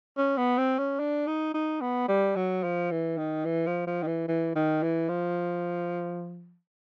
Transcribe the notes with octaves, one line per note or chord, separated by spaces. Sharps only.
C#4
B3
C4
C#4
D4
D#4
D#4
B3
G3
F#3
F3
E3
D#3
E3
F3
F3
D#3
E3
E3
D#3
E3
F3